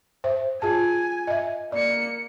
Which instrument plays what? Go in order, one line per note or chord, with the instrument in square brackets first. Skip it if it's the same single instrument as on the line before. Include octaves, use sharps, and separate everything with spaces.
[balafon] C5 E5
[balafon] F4 G#4 A5 [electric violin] G#5
[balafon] D#5 E5
[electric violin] A#3 C#7 [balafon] D5